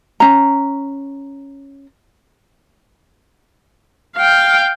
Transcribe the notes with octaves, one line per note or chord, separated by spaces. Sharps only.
C#4 A#5
F5 G5